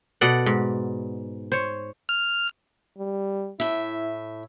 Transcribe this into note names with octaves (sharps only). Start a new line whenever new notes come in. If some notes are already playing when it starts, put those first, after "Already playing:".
B2 A4 D5 F#5
G#2
C5 C#5
F6
G3
A2 E4 E5